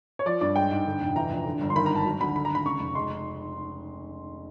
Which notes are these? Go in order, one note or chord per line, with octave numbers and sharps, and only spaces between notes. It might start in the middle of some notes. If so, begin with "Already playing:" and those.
C#5
F3 D5
G2 D5
G#3 G5
G#2
D3
F1
E3 A#5
A#1
D3
G1
C6
D#3 B5
G#1 A#5
A5
F#3
D2 B5
D3 B5
A#5
G#1 B5
C#3 C#6
F1
G#3 C6